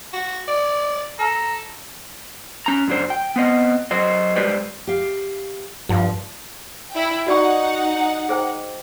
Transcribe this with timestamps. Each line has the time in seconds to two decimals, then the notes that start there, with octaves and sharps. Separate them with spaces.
0.13 F#4
0.48 D5
1.19 A4 A#5
2.66 C#4 A#5
2.88 F#2 F#3 D4 C5
3.10 G5
3.36 B3 C4 D#5
3.91 F#3 C5 D#5
4.36 G3 G#3 G4 B4 C5 D5
4.87 G4 F5
5.89 G2 F3
6.91 E4 G5
7.27 D#4 F#4 D5 F#5 C#6
8.29 G#4 C5 G5